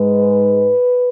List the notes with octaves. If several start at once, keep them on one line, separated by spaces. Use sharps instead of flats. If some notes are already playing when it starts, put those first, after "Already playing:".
Already playing: G#2 G#3 B4